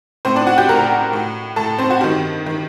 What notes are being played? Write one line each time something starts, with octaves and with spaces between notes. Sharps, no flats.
A2 C4 C5
D4 D5
F#4 F#5
G4 G5
A2 A#4 A#5
A2
A2 A4 A5
C4 C5
F#4
G2 D#3 G4
D#3